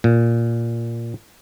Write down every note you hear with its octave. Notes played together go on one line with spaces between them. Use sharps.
A#2